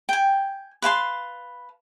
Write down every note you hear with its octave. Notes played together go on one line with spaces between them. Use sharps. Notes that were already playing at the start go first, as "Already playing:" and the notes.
G5 G#5
B4 F5 A5 C6